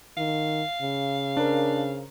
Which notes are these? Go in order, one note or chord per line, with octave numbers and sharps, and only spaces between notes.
D#3 F5
C#3
D4 A#4 C5